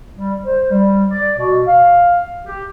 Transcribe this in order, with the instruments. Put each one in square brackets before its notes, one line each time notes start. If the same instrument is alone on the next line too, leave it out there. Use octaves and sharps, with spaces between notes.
[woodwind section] G3
C5
G3
D5
B2
F5
G4